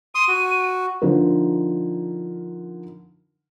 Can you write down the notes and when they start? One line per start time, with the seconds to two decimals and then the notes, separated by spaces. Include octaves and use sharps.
0.15 C6 D#6 D#7
0.28 F#4
1.02 D3 F3 D#4 A#4